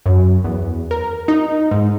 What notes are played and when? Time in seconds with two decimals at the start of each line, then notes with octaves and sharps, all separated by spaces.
0.06 F#2
0.44 E2
0.91 A#4
1.28 D#4
1.71 G#2